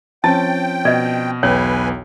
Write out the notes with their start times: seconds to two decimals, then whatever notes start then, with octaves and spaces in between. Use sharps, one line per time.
0.24 F3 C4 C#4 G5 A5 A6
0.85 B2 D5 D#5
1.43 B1 E2 B4 C#5 G5 G#5